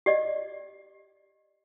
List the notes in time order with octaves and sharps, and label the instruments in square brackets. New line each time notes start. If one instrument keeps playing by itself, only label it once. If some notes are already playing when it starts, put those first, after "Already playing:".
[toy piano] G4 D5 D#5